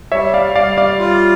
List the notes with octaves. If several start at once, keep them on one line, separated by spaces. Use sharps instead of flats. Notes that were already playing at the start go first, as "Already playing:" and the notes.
G3 C#5 E5
D5 F5
G3 D5 F5
D5 F5
F4